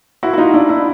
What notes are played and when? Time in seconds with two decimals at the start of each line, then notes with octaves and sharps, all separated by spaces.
0.23 E4 F#4
0.33 F#4
0.38 D#4 F4
0.53 D4 E4
0.69 D4 E4